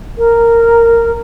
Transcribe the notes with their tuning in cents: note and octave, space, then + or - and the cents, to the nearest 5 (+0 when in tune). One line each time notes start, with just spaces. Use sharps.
A#4 -10